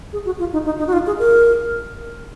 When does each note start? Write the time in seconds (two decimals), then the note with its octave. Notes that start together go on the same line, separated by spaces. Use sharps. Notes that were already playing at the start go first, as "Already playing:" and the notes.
0.13 G#4
0.26 F#4
0.39 F4
0.53 D#4
0.65 D#4
0.79 D#4
0.87 F#4
0.93 F4
1.06 G#4
1.19 A#4